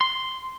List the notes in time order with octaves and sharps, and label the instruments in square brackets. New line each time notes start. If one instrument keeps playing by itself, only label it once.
[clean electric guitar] C6